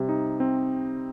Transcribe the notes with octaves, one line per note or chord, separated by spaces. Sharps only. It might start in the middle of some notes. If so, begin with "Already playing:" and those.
Already playing: C3 G3
D#4
C4